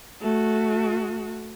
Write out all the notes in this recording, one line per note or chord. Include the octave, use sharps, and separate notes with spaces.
A3 F#4